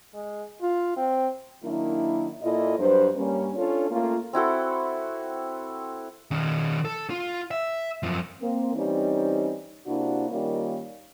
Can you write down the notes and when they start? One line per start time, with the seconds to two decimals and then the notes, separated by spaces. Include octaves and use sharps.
0.14 G#3
0.62 F4
0.97 C4
1.64 D#3 F#3 A#3 D4 E4
2.42 A#2 E4 F4 A4 D5 D#5
2.79 G2 F#3 D4 B4 C5
3.16 G2 G3 A#3 C#4
3.56 C#4 D4 F4 A4 C#5
3.90 A3 A#3 C#4 F4
4.33 C4 E4 F#4 A4
6.31 D#3 C#4
6.85 A4
7.10 F4
7.51 E5
8.03 F#2 F3
8.41 A#3 C4
8.74 E3 G3 C4 C#4 D#4
9.86 C3 A#3 D4 E4 F#4
10.31 D#3 G3 A#3 C#4 D#4 F4